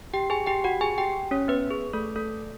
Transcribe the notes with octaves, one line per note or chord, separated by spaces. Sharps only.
G4 G5
G#4 G#5
G4 G5
F#4 F#5
G#4 G#5
G4 G5
C#4 C#5
B3 B4
G#4
A3 A4
A3 A4